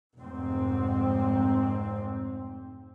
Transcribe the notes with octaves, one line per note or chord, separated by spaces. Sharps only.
F1 G#2 C4